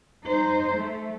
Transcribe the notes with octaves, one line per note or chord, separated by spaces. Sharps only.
D#4 C5
A3